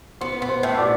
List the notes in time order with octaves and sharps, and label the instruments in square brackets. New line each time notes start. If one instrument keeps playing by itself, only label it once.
[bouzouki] B3 [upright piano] C5 C6
[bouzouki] B3
[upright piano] C5 C6
[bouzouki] A2
[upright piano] D5 D6